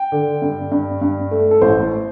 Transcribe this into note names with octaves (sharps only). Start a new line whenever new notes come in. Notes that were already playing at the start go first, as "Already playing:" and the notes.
Already playing: G5
D3
G2
G2
G2
A3
A4
A1 C5